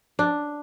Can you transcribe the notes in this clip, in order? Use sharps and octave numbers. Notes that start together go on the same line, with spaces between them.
D4